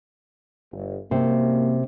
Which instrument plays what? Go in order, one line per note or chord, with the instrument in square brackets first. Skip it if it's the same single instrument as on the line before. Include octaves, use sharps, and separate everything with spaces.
[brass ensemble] G1
[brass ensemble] C2 F#2 A#3 [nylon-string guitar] C3